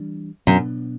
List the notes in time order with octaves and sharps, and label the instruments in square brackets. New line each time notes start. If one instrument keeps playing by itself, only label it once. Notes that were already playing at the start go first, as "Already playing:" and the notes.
Already playing: [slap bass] E3 G3 D4
[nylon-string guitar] F#2 [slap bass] B2 F#3 B3 D4